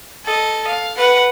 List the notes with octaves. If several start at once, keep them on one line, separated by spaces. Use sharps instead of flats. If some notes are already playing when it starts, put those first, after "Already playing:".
A4 D#5
F5
B4 F#5